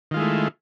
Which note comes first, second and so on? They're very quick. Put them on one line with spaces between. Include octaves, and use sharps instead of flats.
D#3 F4 G#3 E4 A3